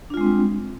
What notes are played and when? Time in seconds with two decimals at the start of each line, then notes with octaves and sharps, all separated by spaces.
0.10 D4
0.14 F4
0.17 G#3
0.21 C4
0.24 G3